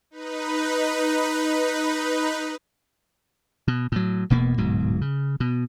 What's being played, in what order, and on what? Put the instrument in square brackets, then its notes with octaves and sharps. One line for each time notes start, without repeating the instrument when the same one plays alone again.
[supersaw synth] D#4 B4
[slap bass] B2
A2 F#3
E1 B2 A#3 B3
D1 G#2 B2 F#3
C#3
B2